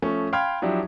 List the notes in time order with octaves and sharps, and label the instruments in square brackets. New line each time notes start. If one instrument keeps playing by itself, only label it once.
[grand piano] F3 A3 C#4
F5 G5 B5 C6 F6 G#6
F3 F#3 D4 E4 G4